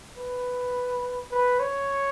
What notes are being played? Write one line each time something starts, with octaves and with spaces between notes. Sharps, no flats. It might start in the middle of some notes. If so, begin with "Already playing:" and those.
B4
B4
C#5